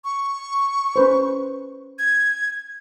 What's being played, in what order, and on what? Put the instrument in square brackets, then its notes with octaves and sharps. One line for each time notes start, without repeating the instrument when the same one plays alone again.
[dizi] C#6
[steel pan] C#4 B4 C5
[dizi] G#6